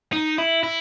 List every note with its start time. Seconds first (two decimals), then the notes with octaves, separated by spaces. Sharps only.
0.13 D#4
0.38 E4
0.63 E4